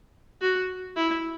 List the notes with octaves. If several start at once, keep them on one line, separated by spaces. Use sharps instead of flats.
F#4
E4